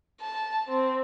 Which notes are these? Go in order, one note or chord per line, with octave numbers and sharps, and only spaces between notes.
A5
C4